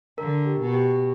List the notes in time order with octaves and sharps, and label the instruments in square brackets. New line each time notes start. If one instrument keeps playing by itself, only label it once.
[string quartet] D3 [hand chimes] A#4
[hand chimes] G4
[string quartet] B2
[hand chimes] G4